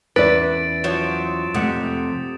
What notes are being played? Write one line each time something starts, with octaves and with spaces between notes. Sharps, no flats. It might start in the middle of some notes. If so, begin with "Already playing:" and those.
E2 C#4 E4 B4 D5 A6 D7
F3 F#3 E7
F2 C3 A3 F#5 D#6